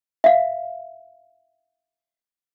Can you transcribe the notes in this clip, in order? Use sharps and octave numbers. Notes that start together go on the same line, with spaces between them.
E5 F5